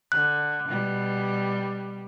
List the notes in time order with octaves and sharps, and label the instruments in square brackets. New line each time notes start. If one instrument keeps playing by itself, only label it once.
[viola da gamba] D3 [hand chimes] F#6
[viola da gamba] B2 G3